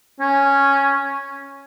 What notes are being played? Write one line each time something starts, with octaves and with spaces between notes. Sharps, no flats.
C#4